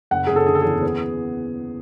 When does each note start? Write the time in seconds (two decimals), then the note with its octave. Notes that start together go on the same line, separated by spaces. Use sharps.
0.11 F#1 F#5
0.27 F#1 G#4
0.36 A4
0.47 D3 G#4
0.55 A4
0.62 E2 G#4
0.83 B3